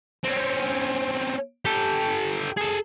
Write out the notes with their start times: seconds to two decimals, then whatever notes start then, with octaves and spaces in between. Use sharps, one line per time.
0.24 C4 C#4
1.65 G4 A4
2.57 G#4 A4